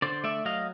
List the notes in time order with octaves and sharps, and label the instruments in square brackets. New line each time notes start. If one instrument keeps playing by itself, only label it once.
[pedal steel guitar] D3 C5 D5
A3 D5 E5
F#3 D#5 F5